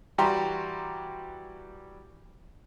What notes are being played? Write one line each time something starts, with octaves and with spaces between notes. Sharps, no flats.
E3 G3 F#4 G4 A#5 C6